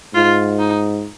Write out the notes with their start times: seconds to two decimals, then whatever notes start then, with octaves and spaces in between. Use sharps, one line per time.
0.14 G#2 F4
0.59 D#4